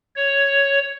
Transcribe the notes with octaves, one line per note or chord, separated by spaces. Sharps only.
C#5